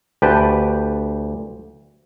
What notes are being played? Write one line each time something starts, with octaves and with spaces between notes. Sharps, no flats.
D2 G4 B4 G5 A5